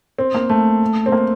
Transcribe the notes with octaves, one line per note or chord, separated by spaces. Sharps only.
C4
A#3
A3
C4
A#3